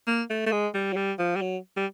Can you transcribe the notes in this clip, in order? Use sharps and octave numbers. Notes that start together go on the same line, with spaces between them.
A#3
A3
A3
G#3
G3
F#3
G3
F3
G3
F#3
G3